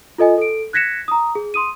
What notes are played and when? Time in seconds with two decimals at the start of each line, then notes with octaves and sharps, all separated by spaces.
0.18 F4 A4 D#5 G#5
0.38 A4 D7
0.73 F#6 G#6 A#6 B6 C#7 E7
1.08 A#5 D#6
1.35 G#4
1.54 C6 D#6 D#7